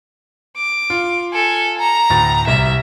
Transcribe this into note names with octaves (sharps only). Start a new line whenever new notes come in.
D6
F4
A4 G#5
A#5
D2 A2 A6
C2 E5